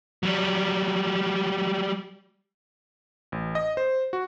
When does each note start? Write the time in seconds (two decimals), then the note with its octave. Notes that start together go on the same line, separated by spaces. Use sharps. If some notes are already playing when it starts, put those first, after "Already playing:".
0.23 F#3 G3
3.32 A1
3.55 D#5
3.77 C5
4.13 F#4